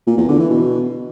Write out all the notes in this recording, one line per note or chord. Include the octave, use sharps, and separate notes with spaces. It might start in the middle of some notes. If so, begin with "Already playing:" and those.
A#2
E2
D3
E3
B2